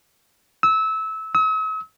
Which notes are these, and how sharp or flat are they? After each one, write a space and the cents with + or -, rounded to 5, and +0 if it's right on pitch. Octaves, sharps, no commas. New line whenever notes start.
E6 -20
E6 -45